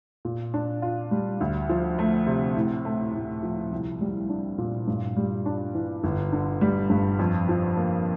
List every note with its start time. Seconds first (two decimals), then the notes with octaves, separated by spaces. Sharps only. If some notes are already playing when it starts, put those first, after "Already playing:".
0.25 A#2
0.54 D4
0.82 F4
1.11 G3
1.41 D2
1.69 F3
1.99 A3
2.27 C3
2.57 A2
2.85 A3
3.14 A2
3.43 F3
3.72 C2
4.01 G3
4.29 D4
4.58 A#2
4.88 G2
5.17 G3
5.46 D4
5.75 E3
6.04 G1
6.33 D3
6.61 G3
6.90 G2
7.19 F2
7.49 F3
7.77 A#3